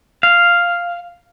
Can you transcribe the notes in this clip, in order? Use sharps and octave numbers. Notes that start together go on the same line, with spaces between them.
F5